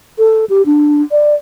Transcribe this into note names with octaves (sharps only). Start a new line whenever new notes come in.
A4
G4
D4
D5